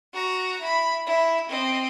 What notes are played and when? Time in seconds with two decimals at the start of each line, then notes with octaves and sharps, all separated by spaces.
0.13 F#4 A#5
0.61 E4 B5
1.06 E4
1.49 C4 D#5